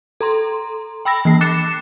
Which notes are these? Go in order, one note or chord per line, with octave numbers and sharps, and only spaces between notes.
A4 A#5 C6
G5 B5 E6 A#6
E3 A#3 C7
D6 F#6 A6 C7 C#7 E7